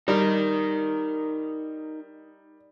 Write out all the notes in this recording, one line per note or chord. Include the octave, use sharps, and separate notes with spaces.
G3 D#4 A#4